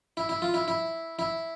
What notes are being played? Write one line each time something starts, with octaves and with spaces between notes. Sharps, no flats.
E4
E4
F4
E4
E4
E4